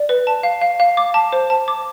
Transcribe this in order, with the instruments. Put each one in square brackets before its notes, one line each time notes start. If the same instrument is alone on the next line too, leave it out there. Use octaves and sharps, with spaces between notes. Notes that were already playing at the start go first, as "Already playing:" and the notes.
Already playing: [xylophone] D5
B4
A5
F5
F5
F5
D6
A5
C5
A5
D6